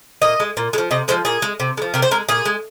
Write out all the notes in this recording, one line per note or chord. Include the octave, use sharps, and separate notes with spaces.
A#2 D#5
G#3
A#2
G#3
F3
C3 D#5
F3 G#3 C5
A#2 G#4
G#3
C3
G#3
F3
C3 A#4
C5
G#3 A#4
A#2 G#4
G#3